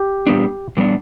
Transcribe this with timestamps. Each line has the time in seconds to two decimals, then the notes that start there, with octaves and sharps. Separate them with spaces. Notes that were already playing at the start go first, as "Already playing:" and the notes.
Already playing: G4
0.27 A#2 G3 B3 D4
0.77 A#2 G3 B3 D4